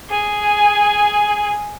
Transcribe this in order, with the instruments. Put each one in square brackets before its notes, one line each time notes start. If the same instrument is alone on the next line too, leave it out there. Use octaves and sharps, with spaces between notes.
[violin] G#4 G#5